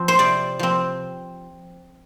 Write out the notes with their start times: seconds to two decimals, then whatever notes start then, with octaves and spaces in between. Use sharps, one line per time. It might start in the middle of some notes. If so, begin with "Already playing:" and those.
Already playing: F3 C4
0.08 C5
0.19 C3 D5
0.59 F3 C4